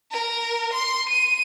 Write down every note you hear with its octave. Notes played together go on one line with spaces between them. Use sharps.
A#4
C6
D#7